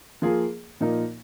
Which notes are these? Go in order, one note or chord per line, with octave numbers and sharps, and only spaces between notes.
F3 A#3 F4 G#4
A#2 F3 A#3 D#4 A#4